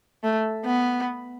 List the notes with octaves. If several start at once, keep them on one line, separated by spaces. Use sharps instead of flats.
A3
B3